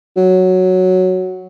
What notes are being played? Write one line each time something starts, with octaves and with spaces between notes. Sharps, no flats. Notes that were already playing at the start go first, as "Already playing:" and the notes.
F#3